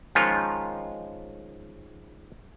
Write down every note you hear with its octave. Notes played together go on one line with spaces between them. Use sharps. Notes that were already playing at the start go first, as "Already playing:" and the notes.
D#3 F3 G#3 C#4 F4